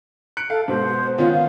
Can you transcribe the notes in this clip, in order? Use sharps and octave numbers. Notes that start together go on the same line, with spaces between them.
F#6 C#7 D7
A4 F5
G#2 B2 C5
D#3 B3 C#4 F4
F5